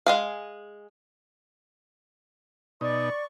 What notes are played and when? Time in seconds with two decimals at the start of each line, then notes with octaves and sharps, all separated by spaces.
0.06 G#3 G#4 F5
2.81 B2 D#4 D5 C#6